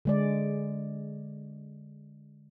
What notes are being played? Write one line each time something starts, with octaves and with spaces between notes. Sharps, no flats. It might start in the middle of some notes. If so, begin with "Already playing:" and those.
D3 G#3 D5